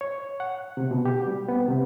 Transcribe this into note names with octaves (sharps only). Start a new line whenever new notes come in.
C#5
F#5
C3
B2
G4
G3
B3
C3